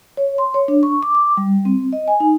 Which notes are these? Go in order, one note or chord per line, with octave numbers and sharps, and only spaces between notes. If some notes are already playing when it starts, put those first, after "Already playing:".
C#5
C6
C#5
D4
C#6
D6
D6
G3
C4
D#5
G#5
D#4